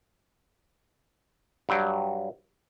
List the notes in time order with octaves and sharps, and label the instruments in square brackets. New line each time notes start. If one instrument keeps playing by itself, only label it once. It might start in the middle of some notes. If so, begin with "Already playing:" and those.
[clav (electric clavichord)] G2 F#3 G5